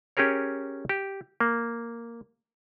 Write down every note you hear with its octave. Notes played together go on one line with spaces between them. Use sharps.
C#4 G4 G#4 A#4 C#5
G4
A#3